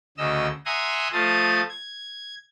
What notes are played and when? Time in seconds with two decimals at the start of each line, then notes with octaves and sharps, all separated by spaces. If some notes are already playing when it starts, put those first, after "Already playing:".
0.17 D2 C#3 D#5 E6
0.66 E5 F#5 G#5 A#5 C6 D#6
1.13 F3 A3 F5 A5 D#6
1.69 G#6